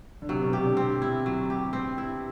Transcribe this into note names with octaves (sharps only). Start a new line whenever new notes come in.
D3
C3 F#3
B2
C3 G4
D3
C4
E4
F#3
G4
C4
E4